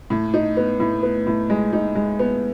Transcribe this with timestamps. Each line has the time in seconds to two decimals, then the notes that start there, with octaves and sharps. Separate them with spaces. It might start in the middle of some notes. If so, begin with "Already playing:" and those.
0.10 A2
0.34 D#4
0.57 B3
0.80 A2
1.03 B3
1.27 A2
1.50 G#3
1.73 D#4
1.95 G#3
2.19 B3